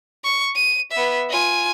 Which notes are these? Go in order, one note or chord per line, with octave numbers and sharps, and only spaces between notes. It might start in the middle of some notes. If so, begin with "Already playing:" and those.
C#6
D#7
B3 E5
F4 G#5